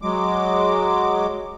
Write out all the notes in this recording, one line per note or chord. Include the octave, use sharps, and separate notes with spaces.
F#3 G#3 D6